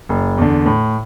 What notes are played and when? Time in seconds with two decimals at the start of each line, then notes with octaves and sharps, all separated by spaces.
0.09 F#1
0.38 E2 D3
0.66 A2